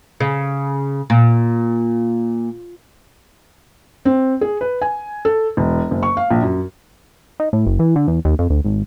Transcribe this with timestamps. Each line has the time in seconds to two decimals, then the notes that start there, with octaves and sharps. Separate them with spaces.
0.20 C#3
1.10 A#2
4.05 C4
4.41 G#4
4.61 B4
4.82 G#5
5.25 A4
5.57 E1
5.91 F#1
6.03 C#6
6.17 F5
6.31 A#1
6.42 F#2
7.40 D#4
7.53 A2
7.67 F#1
7.79 E3
7.96 D3
8.08 E2
8.25 D#2
8.39 F2
8.50 D2
8.65 G#1